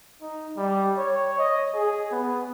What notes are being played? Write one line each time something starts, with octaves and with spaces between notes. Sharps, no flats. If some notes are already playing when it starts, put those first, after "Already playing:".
D#4
G3
C#5
D#5
G#4
B3